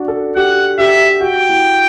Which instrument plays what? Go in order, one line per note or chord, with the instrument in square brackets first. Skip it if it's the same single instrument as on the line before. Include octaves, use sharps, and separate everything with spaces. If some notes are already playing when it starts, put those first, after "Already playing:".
Already playing: [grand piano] D4 F#4
A4
[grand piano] G4 [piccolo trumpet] F#5
[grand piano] G4 [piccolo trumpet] E5
[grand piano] F#4 [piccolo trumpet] G5
[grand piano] E4